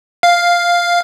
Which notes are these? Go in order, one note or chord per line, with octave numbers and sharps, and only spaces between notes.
F5